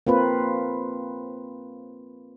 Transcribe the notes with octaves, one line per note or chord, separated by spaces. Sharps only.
A#3 C4 F4 B4